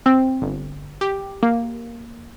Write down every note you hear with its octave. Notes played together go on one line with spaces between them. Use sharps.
C4
G1
G4
A#3